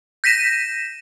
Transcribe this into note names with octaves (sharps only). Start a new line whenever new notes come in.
G6 A#6 B6 D#7 E7